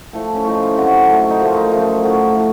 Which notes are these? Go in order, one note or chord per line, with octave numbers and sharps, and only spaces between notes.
A2 F3 A3 A4
C#4
A2 F3 A3 D#4
F4
C3 F#3 A3 F#4
C3 F#3 A3
D#4
F#2 F3 A3 F4
D#4
F#2 F3 A3 F4
A2 F3 A3 F#4
A2 F3 A3